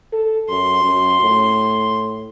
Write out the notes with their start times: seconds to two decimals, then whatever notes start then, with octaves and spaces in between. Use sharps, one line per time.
0.13 A4
0.49 F#2 C6
0.83 F#2
1.22 A2